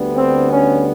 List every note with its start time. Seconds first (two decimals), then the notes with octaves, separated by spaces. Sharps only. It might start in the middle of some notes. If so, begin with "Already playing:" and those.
Already playing: D2 D3 G3 B3
0.16 C4
0.51 C#4